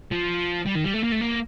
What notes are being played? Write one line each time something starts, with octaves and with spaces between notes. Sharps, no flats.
F3
G3
D#3
G3
A3
A#3
A3
A#3